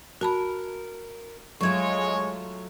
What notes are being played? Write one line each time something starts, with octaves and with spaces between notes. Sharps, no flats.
F#4 A#4 A5 B5
F#3 G#3 A3 F4 C#5 C#6 G#6